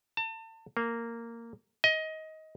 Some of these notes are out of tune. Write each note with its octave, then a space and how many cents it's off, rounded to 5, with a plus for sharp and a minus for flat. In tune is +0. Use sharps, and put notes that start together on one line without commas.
A5 +35
A#3 -10
D#5 +20